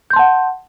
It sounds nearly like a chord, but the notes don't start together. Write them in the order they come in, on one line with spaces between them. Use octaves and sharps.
G6 C6 A5 F#5